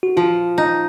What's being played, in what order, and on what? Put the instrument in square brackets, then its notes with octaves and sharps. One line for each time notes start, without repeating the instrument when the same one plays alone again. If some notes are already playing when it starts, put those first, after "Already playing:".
[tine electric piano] F#4
[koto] F3 [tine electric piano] F4
[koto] D#4